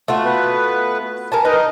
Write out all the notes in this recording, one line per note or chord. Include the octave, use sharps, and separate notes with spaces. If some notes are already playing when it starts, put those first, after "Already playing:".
A3 F4 F#4
B3 B4
A#4 G#5 A5
D#4 A#4 B4 D#5